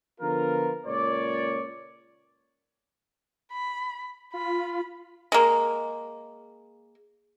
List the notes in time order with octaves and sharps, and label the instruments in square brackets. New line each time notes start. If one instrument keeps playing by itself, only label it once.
[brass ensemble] D3 F3 B3 F4 A#4
C#2 A#2 G#4 C#5 D5
[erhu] B5
[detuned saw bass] F4 [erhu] B5
[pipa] G#3 A#3